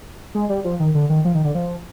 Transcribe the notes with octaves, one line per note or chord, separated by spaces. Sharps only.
G#3
G3
F3
D#3
D3
D#3
F3
D#3
D3
F3